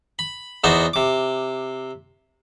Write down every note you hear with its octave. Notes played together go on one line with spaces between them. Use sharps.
B5
E2 B3 D#4 F#4 C5 D5
C3 D6